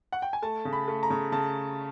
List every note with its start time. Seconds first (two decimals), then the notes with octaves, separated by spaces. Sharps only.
0.12 F#5
0.22 G5
0.33 G#5
0.42 A3 A5
0.65 C#3
0.73 B5
0.88 A3
1.03 A#5
1.10 C#3
1.32 C#3 A5